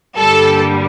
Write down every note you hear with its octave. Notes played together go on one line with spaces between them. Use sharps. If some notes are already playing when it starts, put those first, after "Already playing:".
G2 D3 G3 A#3 A4